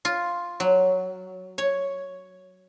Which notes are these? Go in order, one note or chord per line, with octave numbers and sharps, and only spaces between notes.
F4
F#3
C#5